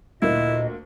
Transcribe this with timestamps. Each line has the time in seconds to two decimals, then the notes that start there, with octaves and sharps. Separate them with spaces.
0.22 D2 A#2 A#3 E4 D#5